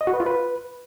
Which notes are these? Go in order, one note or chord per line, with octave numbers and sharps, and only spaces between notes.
D#5
F#4
B4
F4
B4